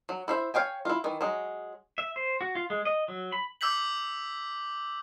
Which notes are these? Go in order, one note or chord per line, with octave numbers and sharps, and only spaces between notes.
F#3
E4 C5 E5
C#5 F5 G5 G#5
E4 F4
D#3 E3
F#3 G#3
E5
C5
F#4
F4
G#3
D#5
F#3
B5
D6 E6 G6 B6 F#7